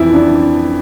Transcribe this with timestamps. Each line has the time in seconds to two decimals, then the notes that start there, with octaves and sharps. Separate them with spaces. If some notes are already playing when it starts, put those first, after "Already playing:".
Already playing: F2 E3 E4
0.13 D4